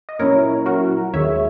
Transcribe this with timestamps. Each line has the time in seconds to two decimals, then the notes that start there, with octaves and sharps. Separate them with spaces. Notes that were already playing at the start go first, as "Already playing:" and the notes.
0.09 D#5
0.19 A#2 F#3 C#4 E4 A#4 C#5
0.66 F#4 A#4
1.14 D#2 D#3 G#3 C#5 E5